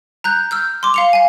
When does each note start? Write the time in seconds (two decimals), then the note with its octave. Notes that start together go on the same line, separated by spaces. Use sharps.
0.24 A#5 F#6 G6
0.51 E6 F6 G6
0.83 C6 D6
0.94 F5 C#7 F7
1.13 F5 G#5